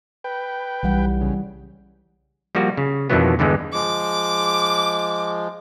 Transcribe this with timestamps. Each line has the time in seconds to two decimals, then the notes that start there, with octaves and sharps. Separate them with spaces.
0.24 B4 G5
0.83 B1 E3 G3 F#5
1.21 C#3
2.55 F3 G3 A#3 F#4
2.77 C#3
3.10 F2 B2 D#3 E3 F#3 B3
3.39 E2 G2 D3 E3 G#3
3.73 F3 G#3 D6